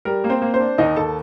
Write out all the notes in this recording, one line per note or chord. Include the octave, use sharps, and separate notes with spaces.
G3 A#4
A#3
C4 C5
A#3
C4 C5
D4
D#2 D#4 D#5
D#2 A4 A5